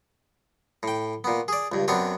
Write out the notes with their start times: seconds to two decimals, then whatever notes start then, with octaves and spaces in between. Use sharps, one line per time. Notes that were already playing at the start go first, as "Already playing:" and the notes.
0.83 A2 G5
1.24 A#2 B3
1.48 G#4 D5
1.72 C#2 G2
1.88 F#2 B3 C4 D4 C#5